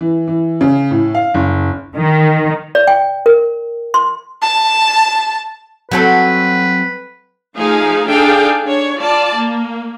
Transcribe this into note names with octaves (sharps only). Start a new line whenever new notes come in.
E3
E3
C#3
A2
F5
F#1
D#3
D5
G5
A#4
C6
A5
F#3 C4 A4 B4
F3 A3 D#4 G#4 F5
D4 D#4 G#4 A4 F5 G5
D4 C#5
F4 D5 A5
A#3